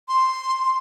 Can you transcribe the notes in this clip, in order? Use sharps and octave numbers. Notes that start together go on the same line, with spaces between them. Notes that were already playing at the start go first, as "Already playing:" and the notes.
C6